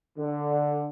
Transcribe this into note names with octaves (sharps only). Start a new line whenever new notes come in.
D3